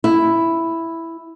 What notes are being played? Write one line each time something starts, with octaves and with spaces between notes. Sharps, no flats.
E4